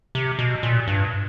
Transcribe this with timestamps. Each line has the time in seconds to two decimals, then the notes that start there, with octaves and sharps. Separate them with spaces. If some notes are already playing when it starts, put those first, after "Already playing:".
0.15 C3
0.39 B2
0.63 A#2
0.88 G2